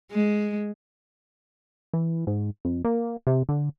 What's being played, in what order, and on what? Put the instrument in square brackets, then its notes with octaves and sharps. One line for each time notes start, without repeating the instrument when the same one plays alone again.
[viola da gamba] G#3
[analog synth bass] E3
G#2
F2
A#3
C3
D3